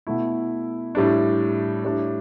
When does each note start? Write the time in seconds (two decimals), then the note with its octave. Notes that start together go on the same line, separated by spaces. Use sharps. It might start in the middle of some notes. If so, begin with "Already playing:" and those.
0.07 B2 A3 E4
0.95 A2 G3 D4
1.85 A2 G3 D4